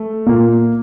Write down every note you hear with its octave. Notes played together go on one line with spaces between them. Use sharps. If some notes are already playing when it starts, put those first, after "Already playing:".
Already playing: A3
A#2 A#3